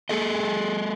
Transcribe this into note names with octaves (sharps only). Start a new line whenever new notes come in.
G#3 G#4 A4 D#5